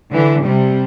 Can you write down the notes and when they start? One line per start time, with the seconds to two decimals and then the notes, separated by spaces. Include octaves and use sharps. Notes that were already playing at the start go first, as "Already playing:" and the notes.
0.10 D3 E3
0.44 C3 G3